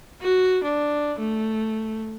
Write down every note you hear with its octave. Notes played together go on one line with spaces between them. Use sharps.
F#4
D4
A3